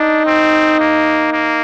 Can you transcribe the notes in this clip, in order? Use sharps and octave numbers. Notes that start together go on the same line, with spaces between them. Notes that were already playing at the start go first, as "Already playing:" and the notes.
Already playing: D4 D#4
C4
A#3
A#3